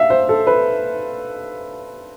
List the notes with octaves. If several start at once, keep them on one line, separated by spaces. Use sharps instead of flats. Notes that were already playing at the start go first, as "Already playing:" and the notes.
Already playing: E5 F5
C5
A4
B4